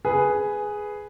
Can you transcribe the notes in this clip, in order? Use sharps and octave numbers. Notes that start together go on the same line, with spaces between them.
G#4 B4